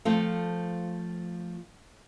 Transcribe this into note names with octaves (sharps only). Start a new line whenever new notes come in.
F3 A3 C4 F4 A4